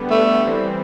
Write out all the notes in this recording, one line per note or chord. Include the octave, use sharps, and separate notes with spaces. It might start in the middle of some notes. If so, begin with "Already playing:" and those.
Already playing: D3 G3 B3
A3
E3 G3 C4